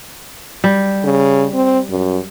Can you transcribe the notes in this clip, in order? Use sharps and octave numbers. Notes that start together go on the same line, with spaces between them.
G3
C#3
C4
F#2